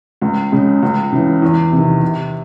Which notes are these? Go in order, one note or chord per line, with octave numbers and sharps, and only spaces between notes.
C#2
C#3 G#3
C#2
C#3 E3
E2
C3 D#3
C3